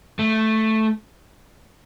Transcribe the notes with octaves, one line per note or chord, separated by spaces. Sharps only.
A3